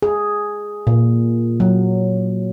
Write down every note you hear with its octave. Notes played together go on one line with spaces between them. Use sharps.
G#4
A#2
F#3